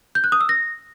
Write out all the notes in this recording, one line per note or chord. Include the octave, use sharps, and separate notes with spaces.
G6
F#6
D#6
E6
A#6